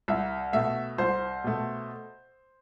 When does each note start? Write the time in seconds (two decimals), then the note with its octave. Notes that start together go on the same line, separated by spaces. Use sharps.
0.08 C2 E5
0.53 B2 A3 E5
0.98 C2 C5
1.44 B2 A3